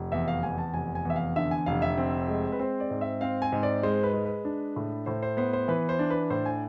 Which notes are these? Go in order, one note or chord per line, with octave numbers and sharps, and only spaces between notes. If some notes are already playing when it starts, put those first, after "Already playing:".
Already playing: F1
E2 E5
F5
E2 G#5
A5
F1 G#5
G#5
E2
E5
F5
D3 E5
G#5
F1 F5
E5
C4
G#3
B4
C4 C5
D5
G#2
E5
C4 F5
G#5
G#2
D5
G#3 C5
B4
G#3
B4
D4
A2
A2 C5
C5
B3 C5
C5
E3 B4
C5
D4
B4
A2 C5
G#5